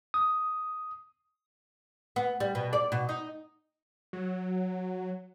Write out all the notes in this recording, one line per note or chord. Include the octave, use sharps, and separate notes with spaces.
D#6
B3
G3
B2
D5
B2
D#4
F#3